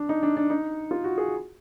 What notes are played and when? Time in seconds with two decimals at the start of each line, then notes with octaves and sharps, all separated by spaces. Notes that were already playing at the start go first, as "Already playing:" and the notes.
Already playing: D4
0.09 D#4
0.23 D4
0.37 D4
0.50 D#4
0.91 F4
1.04 F#4
1.18 G#4